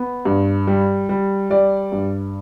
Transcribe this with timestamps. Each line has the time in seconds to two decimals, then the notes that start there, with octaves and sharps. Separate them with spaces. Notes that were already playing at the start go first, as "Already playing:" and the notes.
Already playing: B3
0.25 G2
0.67 G3
1.09 G3
1.50 G3 D5
1.92 G2